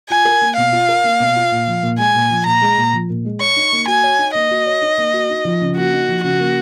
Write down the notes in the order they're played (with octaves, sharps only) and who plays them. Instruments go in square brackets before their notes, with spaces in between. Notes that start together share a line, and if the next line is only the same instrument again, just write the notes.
[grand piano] F4 [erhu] G#5
[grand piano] A#4
A#3
[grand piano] B2 [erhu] F5
[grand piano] F4
A#4
A#3
B2
F4
A#2
F3
A#2
[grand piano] G#3 [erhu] G#5
[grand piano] A#2
F3
[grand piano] A#2 [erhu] A#5
[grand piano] G#3
A#2
F3
A#2
G#3
[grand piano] C#5 [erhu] C#6
[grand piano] D#4
A#3
[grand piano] F#4 [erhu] G#5
[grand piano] C#5
D#4
[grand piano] A#3 [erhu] D#5
[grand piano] F#4
C#5
D#4
A#3
F#4
D#4
F3
C#3
[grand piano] A#3 [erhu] F#4
[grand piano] D#4
F3
[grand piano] C#3 [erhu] F#4
[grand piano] A#3